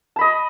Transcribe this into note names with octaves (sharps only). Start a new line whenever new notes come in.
D#5 A5 B5